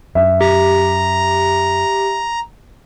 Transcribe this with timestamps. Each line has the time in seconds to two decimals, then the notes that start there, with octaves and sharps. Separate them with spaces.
0.15 F#2 E5
0.41 G4 A#5